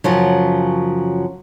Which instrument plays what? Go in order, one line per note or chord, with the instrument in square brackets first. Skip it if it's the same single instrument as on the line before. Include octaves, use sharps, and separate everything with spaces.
[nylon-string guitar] F#2 C#3 F3 F#3